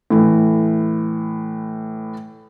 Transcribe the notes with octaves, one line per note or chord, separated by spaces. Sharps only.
A2 E3